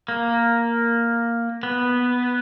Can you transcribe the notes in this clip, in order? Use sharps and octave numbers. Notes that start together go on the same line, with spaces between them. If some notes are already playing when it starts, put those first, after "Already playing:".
A#3
B3